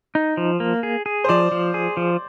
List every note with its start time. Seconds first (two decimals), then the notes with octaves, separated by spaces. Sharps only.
0.15 D#4
0.37 F3
0.60 A#3
0.83 G#4
1.06 G#4
1.24 C5
1.29 F3 D5
1.52 F3
1.74 G#4
1.97 F3